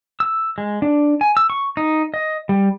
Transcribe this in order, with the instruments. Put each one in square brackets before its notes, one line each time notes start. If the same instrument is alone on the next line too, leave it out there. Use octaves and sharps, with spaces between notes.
[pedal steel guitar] E6
G#3
D4
G#5
E6
C#6
D#4
D#5
G3